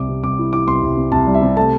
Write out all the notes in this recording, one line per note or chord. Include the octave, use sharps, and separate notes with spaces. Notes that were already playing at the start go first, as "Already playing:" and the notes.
Already playing: C2 G3 D6
C3
C2 D6
E4
E4 D6
C2 C6
C2
C3
C2 A5
G3
E5
C3
A3 A5